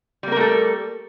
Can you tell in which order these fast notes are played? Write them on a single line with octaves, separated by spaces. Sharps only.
G3 A#3 A#4 A3 A4